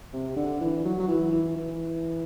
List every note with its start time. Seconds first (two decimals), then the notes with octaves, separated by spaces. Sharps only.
0.13 C3
0.36 D3
0.61 E3
0.85 F#3
0.99 F#3
1.08 E3
1.32 E3
1.56 E3